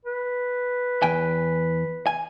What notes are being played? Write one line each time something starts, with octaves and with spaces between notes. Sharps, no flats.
B4
E2 G5 G#5
G#5